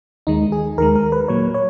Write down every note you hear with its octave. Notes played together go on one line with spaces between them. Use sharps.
D#2 D#3 G#3 D#4
G#4
D#2 D#3 G#3 A#4
A#4
B4
A#2 F#3 A#3 C#5
C#5